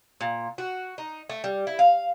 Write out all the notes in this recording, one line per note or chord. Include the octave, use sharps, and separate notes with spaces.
A#2
F#4
D#4
A3
G3
E4
F5